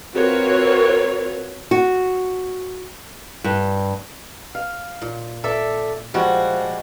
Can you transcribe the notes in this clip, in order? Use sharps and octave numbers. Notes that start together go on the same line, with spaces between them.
C4 F4 F#4 A#4 B4 C#5
F#4
G2
F5
A#2
A4 D5 E5
F3 G3 G#3 F#4